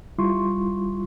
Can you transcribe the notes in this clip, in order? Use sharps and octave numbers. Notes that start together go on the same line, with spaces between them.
G3 E4 F4 C6 C#6